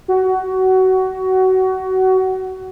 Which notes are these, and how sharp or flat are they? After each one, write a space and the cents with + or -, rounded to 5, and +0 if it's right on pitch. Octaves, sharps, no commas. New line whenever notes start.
F#4 +20